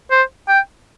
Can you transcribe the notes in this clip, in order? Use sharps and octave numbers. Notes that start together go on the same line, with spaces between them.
C5
G5